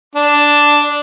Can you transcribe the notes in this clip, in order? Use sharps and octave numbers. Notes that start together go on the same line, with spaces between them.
D4